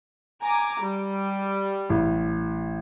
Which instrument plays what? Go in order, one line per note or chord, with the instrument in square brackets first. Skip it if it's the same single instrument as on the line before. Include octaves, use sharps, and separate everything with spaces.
[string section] G#5 A#5 D6
G3
[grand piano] A1